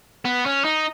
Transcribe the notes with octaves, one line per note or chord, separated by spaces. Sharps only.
B3
C#4
D#4